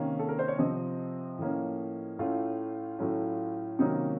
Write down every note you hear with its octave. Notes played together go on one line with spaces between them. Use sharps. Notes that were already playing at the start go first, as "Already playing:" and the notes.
Already playing: C3 D#3 A#3 C#4
A4
A#4
C5
C#5
C3 F3 C4 D#5
A2 F3 A#3 C#4
A2 A3 C#4 F4
A2 F#3 A3 C#4
C3 D#3 F#3 A#3 C#4 D#4